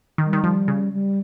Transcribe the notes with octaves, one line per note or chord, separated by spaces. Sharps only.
D#3
G3
D#3
F3 G3
C#3
G3